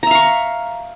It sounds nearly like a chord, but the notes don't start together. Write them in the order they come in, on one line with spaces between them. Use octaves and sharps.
A#5 E5 F5 C#6